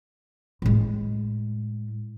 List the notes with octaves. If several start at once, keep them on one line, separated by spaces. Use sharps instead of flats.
A2 G#3